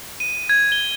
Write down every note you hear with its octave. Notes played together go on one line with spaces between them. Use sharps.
D#7
G#6
G7